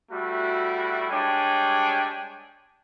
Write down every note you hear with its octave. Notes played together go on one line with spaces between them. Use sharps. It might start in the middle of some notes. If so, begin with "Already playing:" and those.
G3 A3 E4 F#4
G3 G#3 D4 C#5 G5 G#5